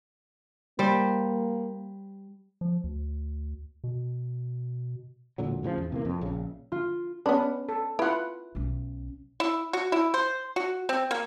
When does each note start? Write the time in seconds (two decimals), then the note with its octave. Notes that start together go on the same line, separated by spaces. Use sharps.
0.79 G3 A#3 C5
2.61 F3
2.84 D2
3.84 B2
5.38 E1 A#2 D3 F#3
5.63 A2 C#3 E3 F3
5.78 E2
5.92 C3 E3 A#3
6.05 F2
6.21 A#1 C#3
6.72 F4
7.26 B3 C#4 D4 B4
7.69 A4
7.99 E4 F4 B4 F#5
8.55 B1 C#4
9.40 E4
9.73 F#4
9.92 E4
10.14 C5
10.56 F#4
10.89 C4
11.11 A#3